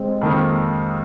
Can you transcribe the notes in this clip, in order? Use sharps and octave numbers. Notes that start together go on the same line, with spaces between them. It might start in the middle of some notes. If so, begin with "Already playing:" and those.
Already playing: G#3 C4
F2 D#3 A#3